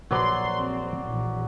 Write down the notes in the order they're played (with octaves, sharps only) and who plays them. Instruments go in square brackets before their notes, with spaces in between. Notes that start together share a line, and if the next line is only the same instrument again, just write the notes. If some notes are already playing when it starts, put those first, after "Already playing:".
[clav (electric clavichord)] A#1 B4 A#5 [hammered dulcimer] F#3 D5 [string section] C6
[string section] C4
A#1 E2